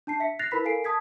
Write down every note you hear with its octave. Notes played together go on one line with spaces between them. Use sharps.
D4 A5 C7
E5 B6 C#7
F#6 A6 A#6 C7 F7
E4 A#4 B4 B5 B6
A4 A#4 F5 G#5 C7 D7
A5 D#6 G#6 B6